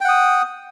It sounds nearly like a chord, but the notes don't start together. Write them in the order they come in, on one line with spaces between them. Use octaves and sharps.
G5 F#5 D#6